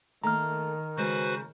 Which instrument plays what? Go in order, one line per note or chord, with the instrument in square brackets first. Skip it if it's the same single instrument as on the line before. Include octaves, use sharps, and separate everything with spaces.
[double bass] D#3 [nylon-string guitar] A3 A#3 [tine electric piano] A#5 F6
[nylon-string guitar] C#3 G#3 [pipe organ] F#4 B4 C5